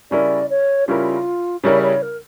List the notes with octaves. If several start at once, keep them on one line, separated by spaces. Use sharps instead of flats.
C#3 G3 C#4 E4 A#4 D5
C#5
C#3 G3 C#4 E4 F4 A#4
C#3 G3 C#4 E4 A#4 C#5
C#5
A#4